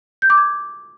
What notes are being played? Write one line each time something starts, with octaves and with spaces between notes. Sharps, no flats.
G6
D6
G#6